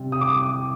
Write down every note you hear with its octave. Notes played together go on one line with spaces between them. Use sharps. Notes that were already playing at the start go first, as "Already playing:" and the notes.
Already playing: C3 G3
D#6
D6